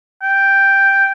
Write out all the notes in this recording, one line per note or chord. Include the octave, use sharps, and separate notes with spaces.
G5